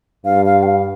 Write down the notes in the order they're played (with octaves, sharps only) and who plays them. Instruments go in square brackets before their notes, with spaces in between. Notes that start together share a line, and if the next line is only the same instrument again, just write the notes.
[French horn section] G2 [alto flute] F5
[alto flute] F5
G5
F5